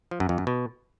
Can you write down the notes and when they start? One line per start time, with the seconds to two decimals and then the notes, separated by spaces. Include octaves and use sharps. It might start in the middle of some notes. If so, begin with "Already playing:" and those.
0.11 F3
0.20 F#2
0.29 F2
0.38 F#2
0.47 B2